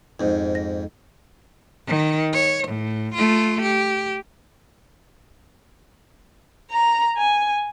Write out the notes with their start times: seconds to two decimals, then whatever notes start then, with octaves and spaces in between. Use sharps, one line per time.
0.20 F2 G#2 D#4 C5
0.55 A#6
1.87 D#3
2.33 C#5
2.68 A2
3.14 A3 F4
3.62 G4
6.70 A#5
7.17 G#5